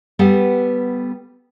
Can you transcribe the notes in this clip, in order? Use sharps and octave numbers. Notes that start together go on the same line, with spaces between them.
G3 B3 A4 B4 F#5